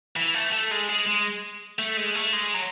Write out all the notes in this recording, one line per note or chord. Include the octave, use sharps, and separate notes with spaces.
E3
A3
A3
G#3
G#3
G#3
A3
G#3
A3
G#3
F#3